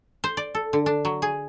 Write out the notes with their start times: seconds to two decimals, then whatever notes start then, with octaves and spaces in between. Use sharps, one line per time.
0.24 C5
0.37 D5
0.55 A4
0.73 D3
0.86 D4
1.05 F#3
1.22 G#4